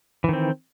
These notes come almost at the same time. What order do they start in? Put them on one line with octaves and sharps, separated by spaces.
E3 D#3 C4